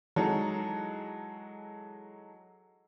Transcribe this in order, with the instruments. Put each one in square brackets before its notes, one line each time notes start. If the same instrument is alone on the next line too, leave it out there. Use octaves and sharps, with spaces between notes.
[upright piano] E3 F#3 G#3 D#4 F#4 A4